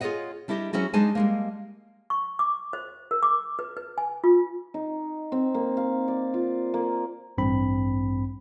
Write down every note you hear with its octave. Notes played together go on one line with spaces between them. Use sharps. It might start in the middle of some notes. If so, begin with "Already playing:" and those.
F4 G#4 A#4 C#5 D#5 F#5
G3 D4 E4 G4 D#5
F#3 C#4 E4 F#4 G#4
G#3 D4 D#4 G#4 G#5 A5
G3 G#3 A#3
C#6
D6
C5
A#4
D6
B4
B4
G#5
F4
D#4
C4
A#3
F5
D5
F4
A#3
A1 G2 C4 B5